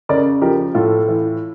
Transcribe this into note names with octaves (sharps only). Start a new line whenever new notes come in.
C#3 A#4 D5
F3 G4 A#4
A2 F4 A4
E3